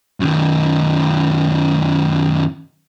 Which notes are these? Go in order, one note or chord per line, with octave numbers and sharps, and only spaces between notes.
F#2 D#3